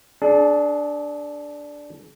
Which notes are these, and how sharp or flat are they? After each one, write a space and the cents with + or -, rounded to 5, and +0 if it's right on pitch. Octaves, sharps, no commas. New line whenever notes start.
D4 +0 G#4 +35